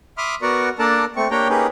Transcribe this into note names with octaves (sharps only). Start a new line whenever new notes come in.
E5 B5 C6 D6 D#6 F6
B3 F#4 A#4 D5 C#6
A#3 D4 A4 A#4 D5 A5
A3 C4 C#6
A#3 D4 G4 C#5 G5 A#5
A#3 C#4 D#4 G4 G#4 B4